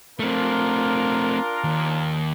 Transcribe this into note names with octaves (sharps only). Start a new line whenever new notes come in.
A3 C4 D4 F4 A#4
D#2